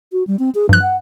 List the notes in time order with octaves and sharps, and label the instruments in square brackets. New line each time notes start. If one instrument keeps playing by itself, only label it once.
[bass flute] F#4
G3
C4
G#4
[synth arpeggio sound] G2 F#6 [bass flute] F3
[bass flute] F#5